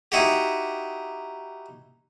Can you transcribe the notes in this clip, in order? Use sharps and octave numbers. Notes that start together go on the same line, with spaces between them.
D#4 E4 F#4 G4